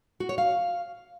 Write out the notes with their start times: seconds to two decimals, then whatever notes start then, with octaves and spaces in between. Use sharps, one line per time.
0.20 F#4
0.29 C#5
0.38 F5